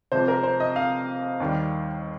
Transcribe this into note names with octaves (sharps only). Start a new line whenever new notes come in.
F2 C3 F3 G#3 C5
A#4
C5
D#5
F5
D#2 D#3 G3